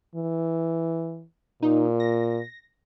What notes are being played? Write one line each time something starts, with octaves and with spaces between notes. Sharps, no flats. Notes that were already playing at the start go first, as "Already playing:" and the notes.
E3
A#2 D#4
A#6